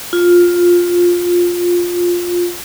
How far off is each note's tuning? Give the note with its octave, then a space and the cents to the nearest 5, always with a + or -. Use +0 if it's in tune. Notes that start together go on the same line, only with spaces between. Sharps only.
F4 +10